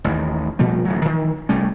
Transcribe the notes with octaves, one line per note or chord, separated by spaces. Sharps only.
A1 D#2 D#3
A#2 F3 G3 A3
D1 A1 F#3
D#3 E3
C2 G3 A3 C#4